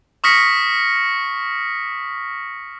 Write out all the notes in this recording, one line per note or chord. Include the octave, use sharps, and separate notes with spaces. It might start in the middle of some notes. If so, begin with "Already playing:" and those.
C#6 D#6 F6 A#6 B6 C#7